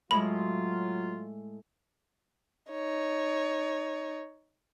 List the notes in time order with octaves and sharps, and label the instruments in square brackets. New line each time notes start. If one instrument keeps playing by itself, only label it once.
[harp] A2 G#3 [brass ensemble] F#3 F4 [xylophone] B5
[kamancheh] D#4 C#5